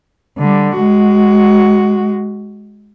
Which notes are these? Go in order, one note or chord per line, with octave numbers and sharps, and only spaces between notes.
D3 G3
G#3 F#4